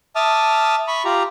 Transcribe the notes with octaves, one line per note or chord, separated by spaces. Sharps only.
E5 A5 D6 D#6 F6
B5 C#6
F4 G4 A#5